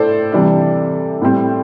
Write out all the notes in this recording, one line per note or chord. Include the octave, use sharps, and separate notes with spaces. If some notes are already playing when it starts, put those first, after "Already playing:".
Already playing: A2 A3 D4 A4 C5 D5
C3 E3 G3 D4
A2 G3 C4